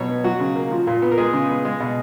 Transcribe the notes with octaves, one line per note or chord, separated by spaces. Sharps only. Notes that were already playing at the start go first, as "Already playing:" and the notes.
Already playing: B2 F#3 C#5
B3
F#3 F#4
C#3
A#3
F3
A#2
B3
A#4
G#3 G#4
C#3
B3
G#3
B2